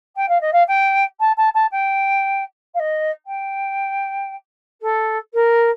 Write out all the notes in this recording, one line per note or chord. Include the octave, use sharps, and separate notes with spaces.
G5
F5
D#5
F5
G5
A5
A5
A5
G5
F5
D#5
G5
A4
A#4